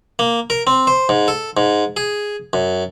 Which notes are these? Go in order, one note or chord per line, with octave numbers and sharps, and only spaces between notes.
A#3
A#4
C4
C5
G#2
A4
G#2
G#4
F#2